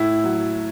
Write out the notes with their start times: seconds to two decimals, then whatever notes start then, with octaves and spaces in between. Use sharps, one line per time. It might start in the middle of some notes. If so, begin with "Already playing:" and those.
Already playing: A2 E4
0.24 F#3